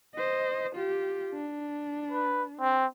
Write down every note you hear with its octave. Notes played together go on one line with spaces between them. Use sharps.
C5 D#5
F4 G4
D4
B4
C4